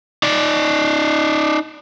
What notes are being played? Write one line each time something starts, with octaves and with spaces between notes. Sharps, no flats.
D#4 D5